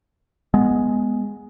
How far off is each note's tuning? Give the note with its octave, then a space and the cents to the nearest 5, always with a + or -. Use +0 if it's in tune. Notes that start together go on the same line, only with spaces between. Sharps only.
G#3 +0 B3 +0